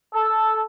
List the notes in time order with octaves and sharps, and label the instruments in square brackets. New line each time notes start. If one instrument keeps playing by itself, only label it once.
[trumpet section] A4